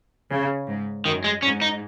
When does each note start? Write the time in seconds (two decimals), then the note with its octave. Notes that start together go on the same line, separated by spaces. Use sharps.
0.30 C#3
0.68 G#2
1.05 F#2 D#3
1.24 G#3
1.43 G#2 C#4
1.62 D#4